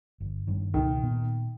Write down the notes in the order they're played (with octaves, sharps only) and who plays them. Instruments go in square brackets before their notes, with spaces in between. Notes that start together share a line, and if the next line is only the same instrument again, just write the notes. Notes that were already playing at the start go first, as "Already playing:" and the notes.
[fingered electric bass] G1
G2 D#3
[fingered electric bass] C#2 B2 [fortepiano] D#3
[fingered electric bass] A#2 B3